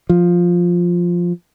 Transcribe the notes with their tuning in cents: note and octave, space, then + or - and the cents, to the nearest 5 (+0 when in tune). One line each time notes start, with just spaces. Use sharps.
F3 +5